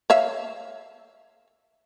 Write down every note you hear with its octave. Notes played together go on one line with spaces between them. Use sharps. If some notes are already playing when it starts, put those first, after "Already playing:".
C#5 E5 F5